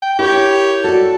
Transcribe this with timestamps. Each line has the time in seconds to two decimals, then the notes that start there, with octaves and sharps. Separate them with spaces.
0.02 G5
0.19 E4 G4 A#4 C#5
0.84 F#4 A4 D5